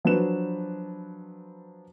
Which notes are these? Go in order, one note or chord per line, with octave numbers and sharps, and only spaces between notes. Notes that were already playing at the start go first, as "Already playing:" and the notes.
F3 F#3 D4 B4 E7